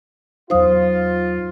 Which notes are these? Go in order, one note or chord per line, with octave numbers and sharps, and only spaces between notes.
E2 F#3 D#4 F4 C5 F5 D#6